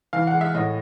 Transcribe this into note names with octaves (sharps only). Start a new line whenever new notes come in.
E3 F5
F#5
G#3
E5
A2 D#5